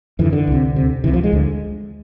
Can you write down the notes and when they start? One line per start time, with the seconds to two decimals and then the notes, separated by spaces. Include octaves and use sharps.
0.19 F2 D3 E3
0.33 D3
0.47 C2 C3
0.76 D2 C3
1.04 C2 C3 E3
1.13 F3
1.24 G#3
1.33 D2 D3